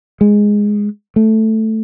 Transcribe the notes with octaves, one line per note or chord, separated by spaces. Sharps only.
G#3
A3